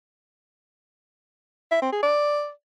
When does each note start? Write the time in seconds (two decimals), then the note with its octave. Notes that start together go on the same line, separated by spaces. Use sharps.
1.71 E5
1.82 C4
1.92 G#4
2.03 D5